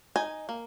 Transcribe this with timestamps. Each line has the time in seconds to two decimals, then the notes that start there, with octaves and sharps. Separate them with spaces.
0.16 D#4 G#5
0.49 A#3